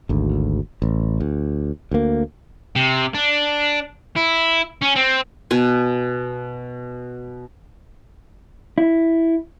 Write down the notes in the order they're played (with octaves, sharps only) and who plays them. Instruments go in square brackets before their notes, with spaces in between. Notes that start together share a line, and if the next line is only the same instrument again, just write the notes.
[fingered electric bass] G#1 D2
A1
D2
D2 A#3
[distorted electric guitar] C3
D4
E4
C#4
C4
[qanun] B2 G#5
[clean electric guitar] E4